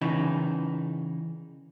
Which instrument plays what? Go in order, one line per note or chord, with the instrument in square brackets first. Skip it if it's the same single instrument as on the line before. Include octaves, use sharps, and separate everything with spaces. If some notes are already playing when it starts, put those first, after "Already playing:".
[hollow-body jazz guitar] C#3 E3 D#4